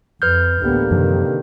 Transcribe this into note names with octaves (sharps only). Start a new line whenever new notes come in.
F2 B4 F6 G6
A1 D2 D3 A#3 B3 G4
F#2 C3 D#3 F3 D4